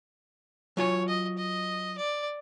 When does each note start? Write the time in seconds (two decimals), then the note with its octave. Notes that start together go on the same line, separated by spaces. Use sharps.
0.77 F#3 F4 C#5 G#5
1.08 D#5
1.38 D#5
1.98 D5